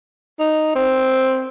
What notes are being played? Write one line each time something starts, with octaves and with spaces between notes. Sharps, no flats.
D#4
C4